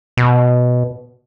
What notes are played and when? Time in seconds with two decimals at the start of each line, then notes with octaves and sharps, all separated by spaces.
0.17 B2